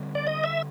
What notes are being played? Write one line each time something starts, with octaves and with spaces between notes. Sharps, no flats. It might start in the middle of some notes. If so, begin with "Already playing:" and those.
Already playing: D3 G3 C4
D5
D#5
E5